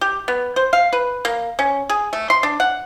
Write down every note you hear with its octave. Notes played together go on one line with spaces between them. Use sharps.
G4
B3
C5
F5
B4
A#3
C#4
G#4
A3
C6
D4
F#5